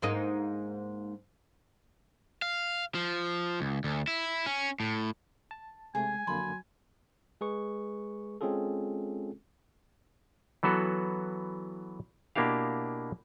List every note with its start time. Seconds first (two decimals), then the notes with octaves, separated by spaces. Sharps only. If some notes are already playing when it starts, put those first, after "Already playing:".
0.02 G#2 A#3 D#4
2.42 F5
2.95 F3
3.61 C#2
3.84 D2
4.08 E4
4.46 C#4
4.80 A2
5.51 A5
5.95 C3 G#3 A3 G#4 G#5
6.27 F2 D3 F#3 A#3 B5 C6
7.41 G#3 G#4 B4 C#6
8.41 G#3 C4 C#4 F4 G#4 A4
10.63 E3 F#3 B3 F#4 A4
12.35 B2 A#3 D4 E4 G4 F5